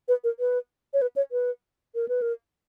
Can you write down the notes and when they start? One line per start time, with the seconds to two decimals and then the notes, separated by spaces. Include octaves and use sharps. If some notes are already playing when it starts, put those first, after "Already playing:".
0.08 B4
0.24 A#4
0.39 B4
0.94 C#5
1.02 B4
1.16 C#5
1.32 B4
1.95 A#4
2.08 B4
2.22 A#4